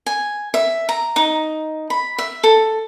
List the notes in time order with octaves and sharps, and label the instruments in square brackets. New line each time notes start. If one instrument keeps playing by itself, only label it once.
[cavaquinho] G#5
E5
A#5
D#4
B5
E5
A4